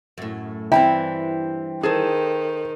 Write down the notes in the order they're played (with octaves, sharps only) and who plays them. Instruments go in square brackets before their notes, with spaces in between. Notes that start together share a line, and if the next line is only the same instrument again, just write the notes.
[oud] F#2 A2
[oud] G2 E3 D4 [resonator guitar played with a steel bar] C4 E4 [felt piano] G5
[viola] D#3 [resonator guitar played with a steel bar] G#4 A4 C5